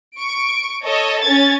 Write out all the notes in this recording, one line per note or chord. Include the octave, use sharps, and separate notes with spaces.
C#6 D7
A4 C#5 D#5
C#4 G#6 A6